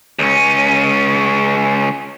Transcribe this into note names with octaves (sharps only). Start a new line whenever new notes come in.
C#2 C#4